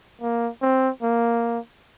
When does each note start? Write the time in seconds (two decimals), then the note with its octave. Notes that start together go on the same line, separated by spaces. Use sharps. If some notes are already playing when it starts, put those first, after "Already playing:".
0.22 A#3
0.62 C4
1.03 A#3